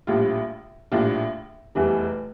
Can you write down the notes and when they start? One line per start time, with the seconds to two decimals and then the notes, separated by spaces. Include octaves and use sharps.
0.07 A#1 A2 G3 D4 F4
0.92 A#1 A2 G3 D4 F4
1.75 F1 E2 E3 G3